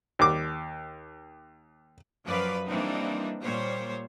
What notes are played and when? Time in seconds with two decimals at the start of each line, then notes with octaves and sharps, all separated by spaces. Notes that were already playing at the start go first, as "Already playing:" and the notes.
0.19 D#2 D6
2.26 F#2 F3 F#3 B4 D5 F5
2.66 E3 G3 A#3 C4 D4 D#4
3.42 A#2 G3 C5 C#5